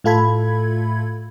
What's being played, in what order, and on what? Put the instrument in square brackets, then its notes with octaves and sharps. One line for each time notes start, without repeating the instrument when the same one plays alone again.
[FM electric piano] A2 A3 F4 A4 B5 G#6